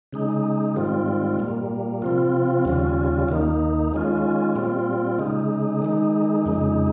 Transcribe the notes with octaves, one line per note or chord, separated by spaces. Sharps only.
C#3 G#3 D#4
G#2 D#3 G3 C4 F4
A#2 G3 A#3
C3 F3 C4 F4
D#2 C#3 G3 C#4 F4
D#2 D#3 A#3 D#4
D#3 G#3 C#4 F4
A#2 G3 C4 F4
C#3 G#3 D#4
D#3 G#3 D#4
F2 C#3 G#3 D#4